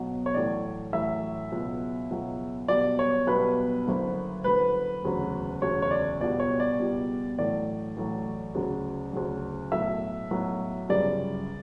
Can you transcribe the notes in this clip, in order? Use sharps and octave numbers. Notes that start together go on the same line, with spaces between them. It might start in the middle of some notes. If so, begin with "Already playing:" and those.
Already playing: B1 B2 F#3
C#5
A1 A2 F#3 D5
A1 A2 F#3 E5
C#2 B2 F#3
C#2 B2 F#3
B1 B2 G3 D5
C#5
B1 B2 G3 B4
F#1 F#2 D3
F#1 F#2 D3 B4
E1 D2 C#3 F#3
E1 D2 C#3 F#3 C#5
C#5
D5
C#2 B2 G3 D5
C#5
D5
C#2 B2 G3
A1 A2 F#3 D5
A1 A2 F#3
D2 C#3 F#3
D2 C#3 F#3
B1 A2 F#3 E5
B1 A2 F#3
G1 F#2 C#3 G3 D5